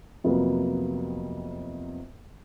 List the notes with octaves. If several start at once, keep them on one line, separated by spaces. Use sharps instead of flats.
F2 C3 F#3 A#3 B3